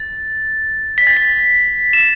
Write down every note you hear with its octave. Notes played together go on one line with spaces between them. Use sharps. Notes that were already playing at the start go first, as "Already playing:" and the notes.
Already playing: A6
B6
A6
B6
E7